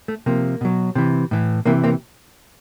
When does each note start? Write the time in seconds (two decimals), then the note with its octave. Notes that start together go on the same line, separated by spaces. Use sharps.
0.08 A3
0.26 C3 F3 A#3
0.61 B2 F#3
0.95 C3 E3
1.31 A2 E3
1.66 C3 E3 A#3
1.84 A#3 C4